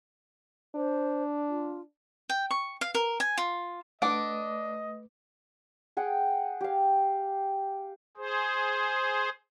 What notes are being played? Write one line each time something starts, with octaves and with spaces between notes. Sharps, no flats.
D4 C5
F4
G5
C#6
F5
A#4
G#5
F4
A3 D4 B4 D#5 F#5 D6
G#4 F#5 G5
G4 F5
G#4 C5